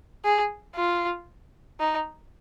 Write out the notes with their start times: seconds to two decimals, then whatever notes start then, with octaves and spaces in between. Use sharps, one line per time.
0.25 G#4
0.76 F4
1.80 D#4